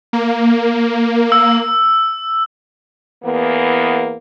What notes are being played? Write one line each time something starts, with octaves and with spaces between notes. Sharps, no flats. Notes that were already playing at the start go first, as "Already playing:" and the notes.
A#3
E6
E2 E3 A#3 B3